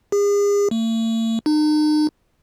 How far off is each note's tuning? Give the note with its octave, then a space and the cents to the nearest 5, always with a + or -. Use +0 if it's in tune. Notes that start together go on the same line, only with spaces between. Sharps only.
G#4 -40
A3 +45
D#4 -40